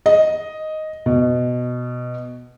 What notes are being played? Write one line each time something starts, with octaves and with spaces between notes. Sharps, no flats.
D#5
B2